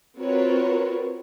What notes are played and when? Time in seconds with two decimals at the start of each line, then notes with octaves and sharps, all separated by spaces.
0.19 C4 F4 F#4 A#4 B4 C#5